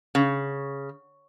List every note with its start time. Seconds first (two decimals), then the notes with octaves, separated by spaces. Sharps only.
0.15 C#3